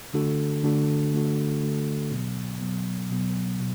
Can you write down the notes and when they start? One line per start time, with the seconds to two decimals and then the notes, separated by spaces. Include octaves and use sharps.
0.14 D3 A3 D4 F#4 A4
0.64 D3 A3 D4 F#4 A4
1.13 D3 A3 D4 F#4 A4
1.62 D3 A3 D4 F#4 A4
2.11 B2 F#3 B3
2.61 B2 F#3 B3
3.10 B2 F#3 B3
3.60 B2